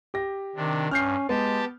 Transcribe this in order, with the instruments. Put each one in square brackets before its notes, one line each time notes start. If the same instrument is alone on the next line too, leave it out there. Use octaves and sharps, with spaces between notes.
[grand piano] G4 A#6
[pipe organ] C3 D4 [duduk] D#3
[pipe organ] G2 [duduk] C#4 [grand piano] F6 G6 C7
[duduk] G#3 [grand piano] B3 [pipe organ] G4 A5